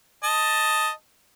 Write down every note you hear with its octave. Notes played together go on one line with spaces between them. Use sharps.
D#5 A5